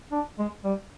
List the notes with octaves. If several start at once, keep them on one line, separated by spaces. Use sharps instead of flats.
D4
G#3
G3